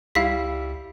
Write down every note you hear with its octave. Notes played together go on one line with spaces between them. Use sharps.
C#2 G3 E4 F5 B6